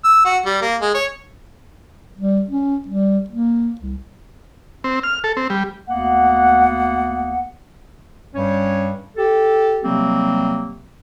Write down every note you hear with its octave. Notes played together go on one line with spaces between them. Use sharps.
E6
F#4
G3
A#3
G#3
C#5
G3
C#4
G3
A#3
C2
C4
F6
A4
C4
G3
D2 A#3 B3 F#5
G2 G3 C#4 C#5
G4 A4
C3 F#3 G3 A#3 C4